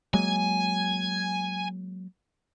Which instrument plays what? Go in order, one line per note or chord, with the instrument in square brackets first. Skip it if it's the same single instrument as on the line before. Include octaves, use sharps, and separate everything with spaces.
[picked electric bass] F#3 G#3 A#3 [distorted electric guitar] G#5